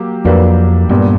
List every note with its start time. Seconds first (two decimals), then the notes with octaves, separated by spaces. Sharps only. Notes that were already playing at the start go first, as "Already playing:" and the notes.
Already playing: F#3 A#3 G4
0.25 F2 F#3 A#3 D4 G4 B4
0.89 G2 A#2 G3 B3